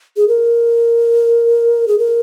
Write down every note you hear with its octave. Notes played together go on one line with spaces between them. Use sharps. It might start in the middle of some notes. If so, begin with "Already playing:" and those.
G#4
A#4
G#4
A#4